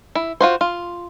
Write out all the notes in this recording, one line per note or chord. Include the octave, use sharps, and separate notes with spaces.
E4
F4 F#4 C5
F4